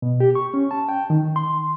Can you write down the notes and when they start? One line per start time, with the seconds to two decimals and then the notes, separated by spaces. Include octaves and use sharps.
0.02 B2
0.20 G4
0.35 C#6
0.54 C#4
0.71 A5
0.89 G5
1.10 D#3
1.36 C6